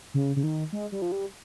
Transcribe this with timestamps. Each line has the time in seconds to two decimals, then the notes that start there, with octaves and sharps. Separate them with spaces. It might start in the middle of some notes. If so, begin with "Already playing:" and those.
0.14 C#3
0.36 C#3
0.43 D#3
0.73 G#3
0.92 G3
1.02 F3
1.12 G3